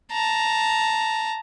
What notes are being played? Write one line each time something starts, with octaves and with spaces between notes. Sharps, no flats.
A5 A#5